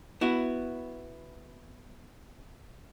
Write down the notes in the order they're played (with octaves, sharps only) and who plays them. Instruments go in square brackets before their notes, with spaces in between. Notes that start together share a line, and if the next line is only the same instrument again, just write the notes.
[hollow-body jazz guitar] B3 E4 F#4